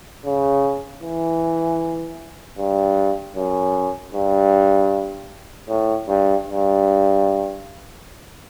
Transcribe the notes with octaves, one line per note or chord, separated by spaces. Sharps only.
C#3
E3
G2
F#2
G2
A2
G2
G2